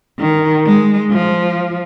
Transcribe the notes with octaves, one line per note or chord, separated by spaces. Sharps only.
D#3
G#3
F3